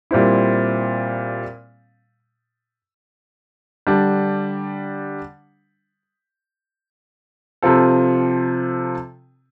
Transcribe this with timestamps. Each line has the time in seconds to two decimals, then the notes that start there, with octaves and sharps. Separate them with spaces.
0.11 A#2 G3 C4 E4
3.87 D3 G3 D4
7.62 C3 F3 C4 F4 A4